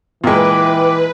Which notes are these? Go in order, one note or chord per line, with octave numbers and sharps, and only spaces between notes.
A#2 E3 G#3 B4 G5 D6